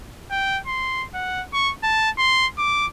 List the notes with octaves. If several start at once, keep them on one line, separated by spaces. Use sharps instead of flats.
G5
C6
F#5
C#6
A5
C6
D6